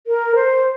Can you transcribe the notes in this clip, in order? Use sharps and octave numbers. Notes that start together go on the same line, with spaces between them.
A#4
C5